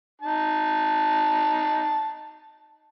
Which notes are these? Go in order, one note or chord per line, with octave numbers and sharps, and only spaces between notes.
D#4 A5